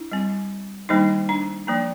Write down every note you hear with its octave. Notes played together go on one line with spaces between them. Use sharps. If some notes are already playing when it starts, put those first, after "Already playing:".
Already playing: D4 E4
G3 C4
D#3 G3 A#3 D4 D#4
D4
F3 A#3 D4